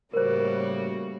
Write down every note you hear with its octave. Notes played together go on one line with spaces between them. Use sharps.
A2 C#3 G3 A#3 F#4 A#4 C5